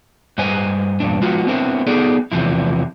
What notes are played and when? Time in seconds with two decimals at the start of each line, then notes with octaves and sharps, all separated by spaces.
0.38 G2 B4 C5 D#5 G#5
1.00 E2 G2 A#2 D4
1.22 F3 G#3 B3 D#4 F4 F#4
1.47 B3 C4 D4 E4 A#4 C5
1.87 B3 D#4 G#4 A4 D5
2.32 E2 C3 E3 F3 E4